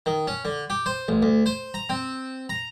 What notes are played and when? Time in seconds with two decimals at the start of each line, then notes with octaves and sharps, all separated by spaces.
0.06 D#3
0.27 C#4
0.45 D3
0.70 G4
0.86 C5
1.08 A1
1.22 D2
1.46 C5
1.74 A#5
1.89 C4
2.49 A#5